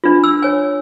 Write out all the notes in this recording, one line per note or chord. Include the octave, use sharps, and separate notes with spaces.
D4 F4
E6
C#5 G#5